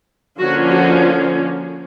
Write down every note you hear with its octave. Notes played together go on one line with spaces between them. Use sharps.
D3 F3 A#3 C#4 F#4
F#4